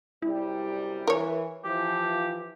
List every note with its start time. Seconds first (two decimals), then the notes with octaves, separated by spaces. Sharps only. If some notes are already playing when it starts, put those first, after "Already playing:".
0.22 F#2 C3 G3 E4
1.07 E3 A#4 C#5
1.64 E3 F3 G4